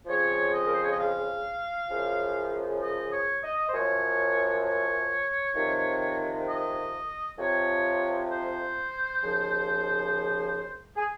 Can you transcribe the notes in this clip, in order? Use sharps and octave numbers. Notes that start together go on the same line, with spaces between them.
F2 C#3 F3 C#5
D#5
A#4
C5
C#5
D#5
F5
F#2 C#3 F3
D#5
C#5
D#5
C5
F#2 F3 C#5
C#5
F2 C3 D#3
D#5
F2 C3 F3 C#5
C5
D#2 C#3 F3
G#4